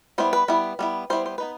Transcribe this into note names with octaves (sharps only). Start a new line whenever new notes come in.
G3 B3 E4 C5
B4
G3 B3 E4
G3 B3 E4
G3 B3 E4 C5
C5
B3 D#4 B4